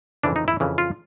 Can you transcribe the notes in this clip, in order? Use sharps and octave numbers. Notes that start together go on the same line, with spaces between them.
F2 C#3 E3 D4
D#4
E4
F2 C#3 E3
F4